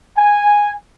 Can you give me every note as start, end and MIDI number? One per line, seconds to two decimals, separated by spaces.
0.18 0.73 80